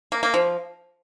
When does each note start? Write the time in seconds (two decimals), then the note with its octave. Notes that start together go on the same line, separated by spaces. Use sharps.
0.12 A#3
0.23 A#3
0.34 F3